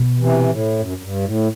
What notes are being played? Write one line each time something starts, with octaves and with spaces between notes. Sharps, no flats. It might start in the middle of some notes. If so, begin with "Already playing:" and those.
Already playing: B2
C3 E3
A2
F#2
F#2
G2
A2